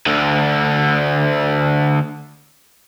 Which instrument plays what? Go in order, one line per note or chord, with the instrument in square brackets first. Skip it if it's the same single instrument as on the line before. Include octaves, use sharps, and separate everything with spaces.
[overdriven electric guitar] D2 D3